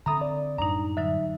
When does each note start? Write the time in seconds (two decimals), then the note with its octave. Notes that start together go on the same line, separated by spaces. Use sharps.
0.06 D3 C4 A4 E5 A#5 B5 D#6
0.21 D5
0.58 F#2 A2 G3 D4 D#4 A#5
0.97 D3 F#3 D#4 E5